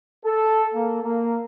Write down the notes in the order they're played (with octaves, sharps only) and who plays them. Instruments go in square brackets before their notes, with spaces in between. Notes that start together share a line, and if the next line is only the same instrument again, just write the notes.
[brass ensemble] A4
A#3
A#3